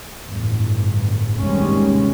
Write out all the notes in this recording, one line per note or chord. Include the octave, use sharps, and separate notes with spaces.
G1 E2 A2
D#2 C3 D#3 G3 G#3 C#4